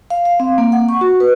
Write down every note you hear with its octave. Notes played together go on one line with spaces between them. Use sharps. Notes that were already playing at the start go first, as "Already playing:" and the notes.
F5
F5
C4
A#3
F#5
C#6
F#4
B4